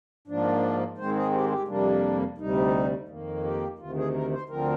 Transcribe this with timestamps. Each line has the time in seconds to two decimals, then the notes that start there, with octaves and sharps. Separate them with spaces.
0.27 G#2 F3 A#3 D4
0.98 G#2 D#3 G#3 C4 C5
1.15 G#4
1.33 G4
1.51 G4
1.68 F2 C3 G3 A#3 D4
2.38 D2 C3 G3 D#4
3.08 F2 D#3 A#3
3.43 G4
3.78 D2 C3 D#3 F4
3.96 G#4
4.14 A#4
4.32 C5
4.49 D2 D3 F3 C4 A#4